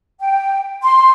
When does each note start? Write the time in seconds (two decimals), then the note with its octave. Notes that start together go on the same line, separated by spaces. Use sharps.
0.20 G5
0.83 C6